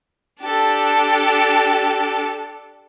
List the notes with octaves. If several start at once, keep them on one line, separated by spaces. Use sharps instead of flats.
D4 G4 A4